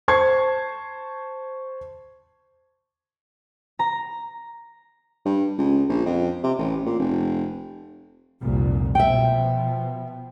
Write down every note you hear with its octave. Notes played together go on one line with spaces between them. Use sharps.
C5 A5 C#6 G#6 C7
A#5
G2
C#2
A#1
F2
C3
A1
A#2
F1
F1 C2 A#2
B2 F3 E5 G5